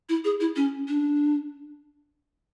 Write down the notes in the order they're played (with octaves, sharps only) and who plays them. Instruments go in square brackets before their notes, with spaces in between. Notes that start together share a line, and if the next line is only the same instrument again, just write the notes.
[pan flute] E4
G#4
E4
C#4
D4